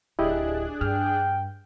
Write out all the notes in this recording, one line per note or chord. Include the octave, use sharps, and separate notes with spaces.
D1 D4 E4 G4 G#4 D#5 F#6
G2 G5 F6